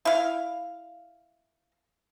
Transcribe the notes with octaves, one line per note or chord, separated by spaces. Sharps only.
E4 F5